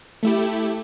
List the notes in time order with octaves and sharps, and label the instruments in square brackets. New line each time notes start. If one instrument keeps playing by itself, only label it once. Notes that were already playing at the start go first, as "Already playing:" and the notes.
[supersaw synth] A3 E4 G4